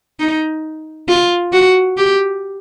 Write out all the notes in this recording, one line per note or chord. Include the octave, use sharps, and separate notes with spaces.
D#4
F4
F#4
G4